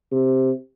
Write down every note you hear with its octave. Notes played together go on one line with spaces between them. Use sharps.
C3